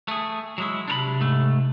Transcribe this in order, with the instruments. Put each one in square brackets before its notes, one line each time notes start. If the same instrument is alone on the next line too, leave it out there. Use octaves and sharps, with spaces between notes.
[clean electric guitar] A3 G#4
F#3 G#3 E4
[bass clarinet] C3 [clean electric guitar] D4 A#4 B5
[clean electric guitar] G#2 A3